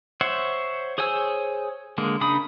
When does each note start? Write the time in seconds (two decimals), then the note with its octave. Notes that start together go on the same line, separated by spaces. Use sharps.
0.21 C5 C#5 E5 F#5
0.98 G#4 C5 C#5 G#5 E6
1.98 D3 G#3 A#3
2.21 C#3 D4 D#4 B5 D#6